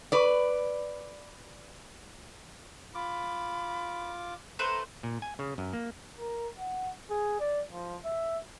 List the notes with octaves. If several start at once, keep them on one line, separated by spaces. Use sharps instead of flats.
B4 D5
F4 B5 D6
A3 B4 C5 A#5
A#2
G#5
C#3
F#2
A#3
A#4
F#5
G#4
D5
F3
E5